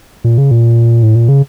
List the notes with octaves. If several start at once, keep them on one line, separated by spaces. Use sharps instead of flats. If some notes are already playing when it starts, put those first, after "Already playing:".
A#2
C#3
A#2
A2
A#2
C#3